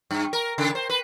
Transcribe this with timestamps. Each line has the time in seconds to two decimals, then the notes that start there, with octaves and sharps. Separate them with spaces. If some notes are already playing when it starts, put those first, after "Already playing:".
0.11 G2
0.33 A#4
0.58 C#3
0.75 C5
0.90 B4